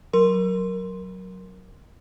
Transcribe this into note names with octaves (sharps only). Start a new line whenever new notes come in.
F#3 A#4 C6